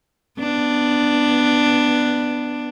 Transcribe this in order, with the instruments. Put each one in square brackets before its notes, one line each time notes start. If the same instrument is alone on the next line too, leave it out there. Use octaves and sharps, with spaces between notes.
[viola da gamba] B3 D4